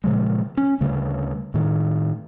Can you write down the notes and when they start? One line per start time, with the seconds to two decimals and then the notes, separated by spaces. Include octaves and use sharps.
0.04 A#2 C#3 F3 G#3
0.57 C#4
0.81 D2 C#3 G3 A3
1.54 A2 D#3